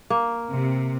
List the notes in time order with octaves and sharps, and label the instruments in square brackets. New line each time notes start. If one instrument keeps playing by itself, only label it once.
[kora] A#3
[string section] C3